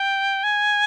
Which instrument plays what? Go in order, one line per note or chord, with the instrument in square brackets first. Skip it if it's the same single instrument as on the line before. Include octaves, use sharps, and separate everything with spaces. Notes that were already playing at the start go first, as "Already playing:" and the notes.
Already playing: [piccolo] G5
G#5